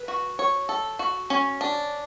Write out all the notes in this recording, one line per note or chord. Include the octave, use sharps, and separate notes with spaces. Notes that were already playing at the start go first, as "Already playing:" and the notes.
Already playing: B4
F#4
C#5
A4
F#4
C#4
D4